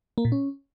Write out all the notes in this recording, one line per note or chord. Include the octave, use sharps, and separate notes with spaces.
A#3
A#2
C#4